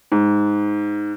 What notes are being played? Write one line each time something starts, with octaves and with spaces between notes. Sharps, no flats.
G#2